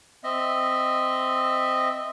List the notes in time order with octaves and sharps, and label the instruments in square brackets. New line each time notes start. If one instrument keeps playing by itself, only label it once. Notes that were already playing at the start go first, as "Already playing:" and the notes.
[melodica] C4 D#5 E5